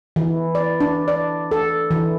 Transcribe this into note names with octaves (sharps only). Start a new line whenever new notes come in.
E3
D5
D4
D5
A4
E3